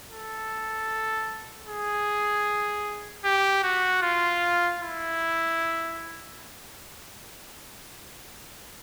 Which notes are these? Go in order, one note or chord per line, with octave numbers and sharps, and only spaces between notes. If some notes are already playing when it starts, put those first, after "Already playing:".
A4
G#4
G4
F#4
F4
E4